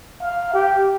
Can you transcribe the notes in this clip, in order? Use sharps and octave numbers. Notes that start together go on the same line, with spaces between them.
F5
G4